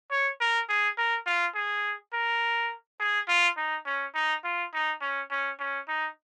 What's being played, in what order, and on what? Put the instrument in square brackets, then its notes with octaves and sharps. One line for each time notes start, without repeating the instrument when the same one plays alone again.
[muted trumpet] C#5
A#4
G#4
A#4
F4
G#4
A#4
G#4
F4
D#4
C#4
D#4
F4
D#4
C#4
C#4
C#4
D#4